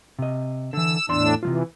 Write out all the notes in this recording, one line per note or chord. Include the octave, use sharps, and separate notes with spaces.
C3 D#5
D3 E3 E6
E2 A2 D4 D5 C6 E6
C3 E3 F#3 F4